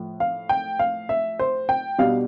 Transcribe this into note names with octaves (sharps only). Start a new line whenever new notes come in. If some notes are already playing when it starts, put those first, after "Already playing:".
Already playing: A2 F3
F5
G5
F5
E5
C5
G5
B2 G3 D4 F5